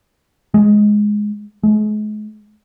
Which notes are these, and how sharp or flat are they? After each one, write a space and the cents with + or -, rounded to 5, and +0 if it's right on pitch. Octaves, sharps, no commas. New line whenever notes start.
G#3 +5
G#3 +40